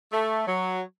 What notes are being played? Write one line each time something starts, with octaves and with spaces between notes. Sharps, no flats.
A3
F#3